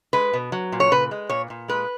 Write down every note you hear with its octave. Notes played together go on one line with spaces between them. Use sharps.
G#3 B4
B2
F#3
A#2
C#5
C#3 B4
G#3
A#2 C#5
A#2
G#3 B4